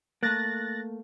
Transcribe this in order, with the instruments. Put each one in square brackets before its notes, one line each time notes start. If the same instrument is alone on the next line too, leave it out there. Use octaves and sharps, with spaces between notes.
[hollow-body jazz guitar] A3 A#3 [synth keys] F#6 A6 A#6